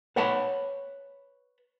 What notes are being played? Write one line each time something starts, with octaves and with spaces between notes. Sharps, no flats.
B4 C#5 F#5 A5 B5